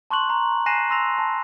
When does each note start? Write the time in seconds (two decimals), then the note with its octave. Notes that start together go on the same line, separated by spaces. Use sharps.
0.10 A5 C6 C#6 F#6 F#7
0.30 A#5
0.66 G#5 F#6 A#6 C7 D#7 E7
0.90 C6 E6 A#6 F7
1.18 A5